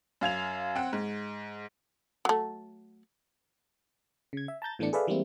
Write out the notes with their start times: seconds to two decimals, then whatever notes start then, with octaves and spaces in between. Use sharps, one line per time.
0.21 F#2 F5 G#6 F7
0.75 C4 F#5
0.93 G#2
2.25 F#3 A3
4.33 C#3 G#6
4.48 E5
4.62 A5 A#5 G6 A6
4.79 A2 E3 A3 B3 D4 C#7
4.93 G#4 A4 B4 D5 E5 F5
5.07 E3 G3 G#3 A#3 C4 E4